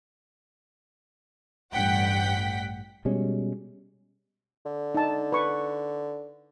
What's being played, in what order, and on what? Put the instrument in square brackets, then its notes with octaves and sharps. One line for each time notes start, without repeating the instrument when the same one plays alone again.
[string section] A1 G2 F#5 G5 B6
[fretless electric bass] B2 G3 G#3 C#4
[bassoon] D3
[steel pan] D#4 A5
B4 C#6